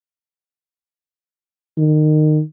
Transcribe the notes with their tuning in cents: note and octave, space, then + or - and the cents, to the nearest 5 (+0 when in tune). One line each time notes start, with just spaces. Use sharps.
D#3 -25